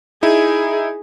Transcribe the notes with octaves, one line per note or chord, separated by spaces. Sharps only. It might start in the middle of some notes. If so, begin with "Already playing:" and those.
D#4 E4 G#4